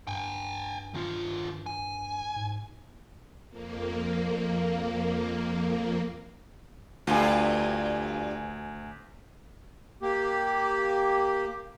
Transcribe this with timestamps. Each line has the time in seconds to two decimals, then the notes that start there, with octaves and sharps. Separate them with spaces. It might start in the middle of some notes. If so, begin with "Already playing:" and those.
0.07 G2 G5 G#5
0.94 D#3 F4
1.66 G#5
2.36 G#2
3.49 F2 A#3
7.07 D2 G2 F4 G#5
10.02 A#3 G4